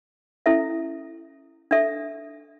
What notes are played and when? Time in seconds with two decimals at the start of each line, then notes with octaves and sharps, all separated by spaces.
0.46 C#4 E4 A4 E5
1.71 D4 A4 E5